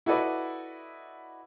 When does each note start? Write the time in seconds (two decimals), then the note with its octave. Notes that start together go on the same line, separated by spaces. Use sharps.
0.06 E4 F#4 A4 B4 D5 D#5